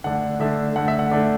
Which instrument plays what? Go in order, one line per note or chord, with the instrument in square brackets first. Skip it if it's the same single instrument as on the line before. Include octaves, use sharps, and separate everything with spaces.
[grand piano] D3 A3 D4 F#5
D3 A3 D4 E5
D3 A3 D4 F#5
E5
F#5
D3 A3 D4